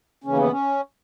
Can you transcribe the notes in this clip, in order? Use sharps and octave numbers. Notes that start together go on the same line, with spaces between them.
D#2 C#3 E3 C#4
B3
C#3 C#4